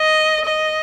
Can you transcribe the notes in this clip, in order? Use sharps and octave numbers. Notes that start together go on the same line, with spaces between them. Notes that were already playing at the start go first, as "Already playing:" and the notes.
Already playing: D#5
D#5